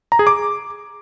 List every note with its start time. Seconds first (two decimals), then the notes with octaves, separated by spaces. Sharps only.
0.12 A#5
0.19 G#4
0.27 D6